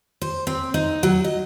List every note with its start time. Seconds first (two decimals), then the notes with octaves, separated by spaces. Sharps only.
0.22 C5
0.47 C4
0.74 D#4
1.03 F#3
1.24 D#5